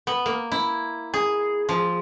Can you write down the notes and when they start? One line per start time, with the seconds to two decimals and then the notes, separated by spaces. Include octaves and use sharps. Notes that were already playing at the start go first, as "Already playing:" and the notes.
0.07 B3
0.26 A#3
0.52 E4
1.14 G#4
1.69 F3